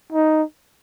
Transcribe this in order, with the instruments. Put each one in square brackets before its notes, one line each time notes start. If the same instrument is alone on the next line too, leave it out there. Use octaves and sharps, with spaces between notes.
[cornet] D#4